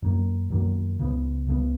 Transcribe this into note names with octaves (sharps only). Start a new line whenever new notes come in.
F#2 D#3 F#3 A#3
F#2 D#3 F#3 A#3
C#2 C#3 G#3 B3
C#2 C#3 G#3 B3